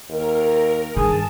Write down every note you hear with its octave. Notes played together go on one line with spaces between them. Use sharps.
D#2 A#4
G2 D#3 G#4 A5